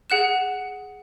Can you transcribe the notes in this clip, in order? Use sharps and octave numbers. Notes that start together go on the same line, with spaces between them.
G#4 F#5 F#6 E7